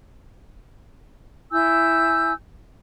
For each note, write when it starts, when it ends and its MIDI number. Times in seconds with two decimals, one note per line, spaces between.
1.52 2.32 64
1.52 2.32 80
1.52 2.32 88
1.52 2.32 91